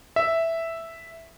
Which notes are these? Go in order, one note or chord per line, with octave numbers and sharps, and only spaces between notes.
E5